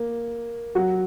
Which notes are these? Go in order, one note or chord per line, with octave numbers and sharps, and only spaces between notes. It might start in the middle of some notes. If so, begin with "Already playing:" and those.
Already playing: A#3
F#3 F#4